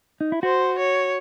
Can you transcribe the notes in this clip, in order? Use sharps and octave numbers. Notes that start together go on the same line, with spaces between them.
D#4
E4
F#4 C5
C#5